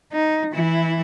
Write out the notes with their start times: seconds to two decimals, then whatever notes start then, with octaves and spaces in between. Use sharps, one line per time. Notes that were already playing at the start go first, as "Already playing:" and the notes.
0.13 D#4
0.53 E3 E4